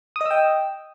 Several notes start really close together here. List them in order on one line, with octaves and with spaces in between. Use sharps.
D#6 D#5 E6 G5